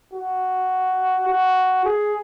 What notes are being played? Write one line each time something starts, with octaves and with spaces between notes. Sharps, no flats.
F#4
F#4
G#4